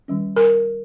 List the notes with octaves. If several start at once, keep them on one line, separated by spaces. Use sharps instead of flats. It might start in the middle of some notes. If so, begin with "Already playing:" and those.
D#3 G3 C#4
A#4